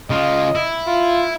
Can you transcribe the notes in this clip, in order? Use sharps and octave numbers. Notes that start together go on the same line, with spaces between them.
C#3 F4 D#5
E4
F4